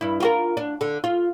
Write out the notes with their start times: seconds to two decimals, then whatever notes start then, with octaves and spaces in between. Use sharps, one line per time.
0.01 G2 E4
0.20 F4 F#4 A#4
0.57 D4
0.81 D3
1.04 F4